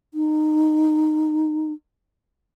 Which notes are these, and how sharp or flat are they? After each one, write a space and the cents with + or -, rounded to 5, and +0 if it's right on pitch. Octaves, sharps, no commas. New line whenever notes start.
D#4 -15